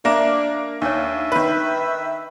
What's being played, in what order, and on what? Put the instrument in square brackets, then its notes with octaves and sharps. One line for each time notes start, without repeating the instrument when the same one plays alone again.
[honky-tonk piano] A#3 [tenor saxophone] D4 [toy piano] E5 A#5
[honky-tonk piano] D#2 [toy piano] D4 C#5 [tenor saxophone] E5
[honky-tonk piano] D#3 B4